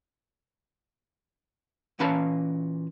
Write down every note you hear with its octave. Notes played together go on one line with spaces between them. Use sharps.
A#2 E3 C#4 B4 F5 A5